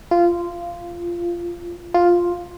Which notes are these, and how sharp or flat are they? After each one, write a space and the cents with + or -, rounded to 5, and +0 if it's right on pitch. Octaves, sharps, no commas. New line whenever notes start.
F4 -15
F4 +5